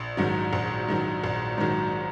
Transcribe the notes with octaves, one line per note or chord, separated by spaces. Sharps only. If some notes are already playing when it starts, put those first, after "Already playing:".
Already playing: A#1
G#2 D#3 F#3
A#1
G#2 D#3 F#3
A#1
G#2 D#3 F#3